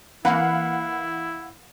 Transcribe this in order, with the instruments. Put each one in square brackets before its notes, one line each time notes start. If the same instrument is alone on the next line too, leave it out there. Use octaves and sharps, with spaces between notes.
[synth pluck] E3 A#3 [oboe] E4 [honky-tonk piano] F5 F#5 B5